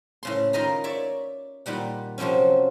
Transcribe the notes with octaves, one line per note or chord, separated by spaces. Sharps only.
A2 C#3 C6
D#3 F4 A#4 D#5 A#5 B5
C#5 D5 E5
A#2 D#3 G3 F#5
C3 F3 F#3 C4 C#4